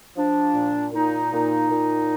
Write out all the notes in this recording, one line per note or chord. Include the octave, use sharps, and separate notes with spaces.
F3 D4
A#2
A#2 D#4
A#2
A#2